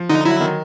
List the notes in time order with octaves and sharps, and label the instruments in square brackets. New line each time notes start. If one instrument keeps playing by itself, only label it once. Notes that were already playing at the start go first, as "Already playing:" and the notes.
Already playing: [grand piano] F3
[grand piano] D3 [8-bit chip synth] D#4
[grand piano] F#3 [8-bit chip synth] E4
[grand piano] D#3